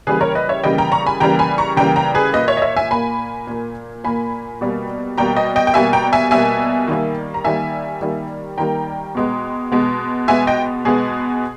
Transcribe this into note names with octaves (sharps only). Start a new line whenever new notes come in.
C#3 E3 G3 A#3 G#4 B4
A#4 C#5
B4 D#5
C#5 E5
C#3 E3 G3 A#3 D#5 G5
G5 A#5
A#5 C#6
G#5 B5
C#3 E3 G3 A#3 G5 A#5
G#5 B5
A#5 C#6
C#3 E3 G3 A#3 G5 A#5
G5 A#5
G#4 B4
A#2 A#3 B4 D#5
C#5 E5
D#5
C#5 E5
E5 G#5
A#2 A#3 G#5 B5
A#2 A#3
A#2 A#3 G#5 B5
B2 G3 A#3
B2 G3 A#3 G5 A#5
D#5 G5
D#5 G5
G5
B2 G3 A#3 E5 G#5
G5 A#5
E5 G#5
B2 G3 A#3 E5 G#5
D#3 G3 A#3
A#5
D#3 G3 A#3 E5 G#5
D#3 G3 A#3
D#3 G3 A#3 G5 A#5
B2 G#3 B3
B2 G#3 B3
B2 G#3 B3 E5 G#5
D#5 G5
B2 G#3 B3 G#4